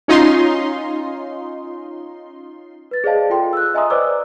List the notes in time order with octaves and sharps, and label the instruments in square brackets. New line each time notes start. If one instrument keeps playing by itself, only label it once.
[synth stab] C#4 D#4 F4 C6
[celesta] B4 A6
G#4 C5 D5 D#5 F5 A5
F4 A4 G5 C6
E6 F#6
D#5 E5 G#5 A#5 C6 D#6
B4 C5 D5 D#5 D6 E6